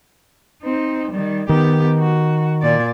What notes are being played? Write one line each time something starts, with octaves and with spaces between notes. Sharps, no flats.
C4 D#4
D#3 G3
D#3 B3 G4
F#4
A#2 D5